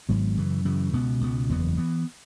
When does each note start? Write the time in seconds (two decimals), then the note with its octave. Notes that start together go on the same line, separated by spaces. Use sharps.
0.09 G#1 G#2 F#3 B3
0.37 F#2 C#3 E3
0.65 F#2 C#3 E3
0.93 C#2 B2 B3
1.21 C#2 B2 B3
1.49 F#1 E2 E3 B3
1.77 E3 B3